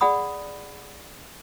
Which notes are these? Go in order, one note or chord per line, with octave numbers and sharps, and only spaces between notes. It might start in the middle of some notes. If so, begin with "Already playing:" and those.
G#4 D5 F#5 B5 D#6